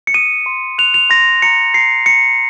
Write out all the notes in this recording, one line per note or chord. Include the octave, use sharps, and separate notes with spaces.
C#7
D#6 D#7
C6
F#6 F7
F7
C6 A#6
A#5 C#7
A#5 C7
A#5 C#7